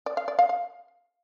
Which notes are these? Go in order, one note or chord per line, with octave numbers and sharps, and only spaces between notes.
D5
F5
D5
F5
F5